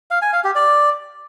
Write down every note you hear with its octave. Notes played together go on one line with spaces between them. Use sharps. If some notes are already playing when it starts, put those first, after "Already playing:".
F5
G#5
F5
G4
D5